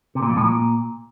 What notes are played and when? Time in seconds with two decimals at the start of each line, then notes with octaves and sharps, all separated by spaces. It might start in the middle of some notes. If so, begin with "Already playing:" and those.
0.15 C3
0.22 A#2
0.30 F2
0.37 A2
0.44 A#2